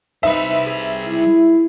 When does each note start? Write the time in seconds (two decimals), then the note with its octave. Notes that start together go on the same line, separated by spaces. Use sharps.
0.23 G3 D#4 B4 C5 E5
0.64 G#4
1.07 E4